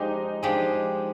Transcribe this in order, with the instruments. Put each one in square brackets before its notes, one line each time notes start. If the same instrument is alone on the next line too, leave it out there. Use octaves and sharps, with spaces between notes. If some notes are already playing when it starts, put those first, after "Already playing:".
Already playing: [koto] F3 G#3 D4 G4 [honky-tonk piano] D#4
[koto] F3 G#3 D4 G4